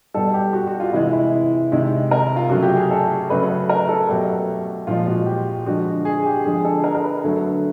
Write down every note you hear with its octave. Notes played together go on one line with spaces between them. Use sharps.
B2 G3 A4
G4
F#4
F#4
F4
C3 E3 G#3 E4
E4
C3 D#3 G#3
A#4
F4
C#3 F#3 A3 F#4
G4
G#4
A4
C#3 F#3 A3 B4
B4
A#4
A4
B2 F#3 A3 G4
A#2 F3 G#3 F4
F#4
G4
D3 F3 G#3 F#4
G#4
G4
D3 F3 G#3 G#4
A4
A#4
A#4
B4
D3 F#3 A3